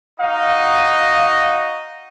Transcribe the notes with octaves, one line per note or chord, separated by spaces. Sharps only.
D#4 F#4 D#5 F5